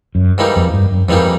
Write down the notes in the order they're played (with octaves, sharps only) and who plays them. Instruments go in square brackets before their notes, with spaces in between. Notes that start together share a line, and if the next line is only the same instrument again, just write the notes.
[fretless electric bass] F#2
[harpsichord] G#2 E3 G3 A#3 D#4
[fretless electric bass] F2
G2
F#2
[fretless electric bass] F2 [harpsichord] G#2 E3 G3 A#3 D#4